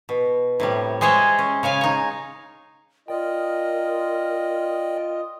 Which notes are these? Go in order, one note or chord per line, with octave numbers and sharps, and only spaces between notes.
B2
A2 C3 G3
G#3 G#4 C5 C#5 D#5 E5
C#4
C#3 C#5 F5 G#5
D#4 C#5
F4 A#4 D5 D#5 G5